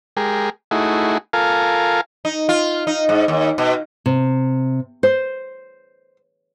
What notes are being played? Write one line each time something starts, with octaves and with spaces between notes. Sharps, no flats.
G#3 G4 G#4 A#4
A3 D#4 E4 F#4 G#4
F4 A4 A#4 F5 G#5
D#4
F4
D#4
G#2
D#2
B2
C3
C5